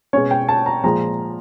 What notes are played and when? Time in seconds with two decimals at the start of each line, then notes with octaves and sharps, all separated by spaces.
0.13 B2 G#3 C#4 C#5
0.31 G5
0.49 A5
0.66 A#5
0.84 A#2 F3 G#3 A#5